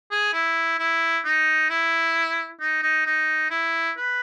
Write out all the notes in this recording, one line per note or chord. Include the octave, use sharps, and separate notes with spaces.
G#4
E4
E4
D#4
E4
D#4
D#4
D#4
E4
B4